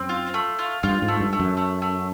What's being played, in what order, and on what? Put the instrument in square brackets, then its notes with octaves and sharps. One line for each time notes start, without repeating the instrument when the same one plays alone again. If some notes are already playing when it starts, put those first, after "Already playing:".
Already playing: [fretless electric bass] F#2 [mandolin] C4
[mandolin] F4
A3
F4
[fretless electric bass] G2 [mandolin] F4
[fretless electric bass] G#2
[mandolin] A3
[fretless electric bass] G2
[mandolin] A3
[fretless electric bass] F#2
[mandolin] A3
A3